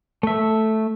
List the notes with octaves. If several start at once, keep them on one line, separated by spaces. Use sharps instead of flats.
A3 E5